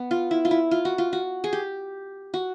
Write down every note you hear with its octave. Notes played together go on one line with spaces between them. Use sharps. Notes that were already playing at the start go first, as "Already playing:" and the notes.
Already playing: B3
F4
E4
F4
E4
F4
F#4
F4
F#4
G#4
G4
F#4